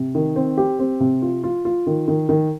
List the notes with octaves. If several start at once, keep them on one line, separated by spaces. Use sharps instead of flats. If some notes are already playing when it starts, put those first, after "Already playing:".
Already playing: C3
D#3
C4
G4
C4
C3
F4
F4
F4
D#3
D#3
D#3